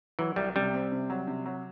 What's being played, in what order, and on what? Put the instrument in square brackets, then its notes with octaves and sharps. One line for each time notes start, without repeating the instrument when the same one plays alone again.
[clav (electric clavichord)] E3 [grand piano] F#3
[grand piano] C2 [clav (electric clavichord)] G3
[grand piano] C3 [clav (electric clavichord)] G3
[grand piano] C4
C3
F#3
C3
F#3